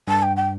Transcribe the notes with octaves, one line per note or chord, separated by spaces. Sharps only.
G2 A5
G5
G5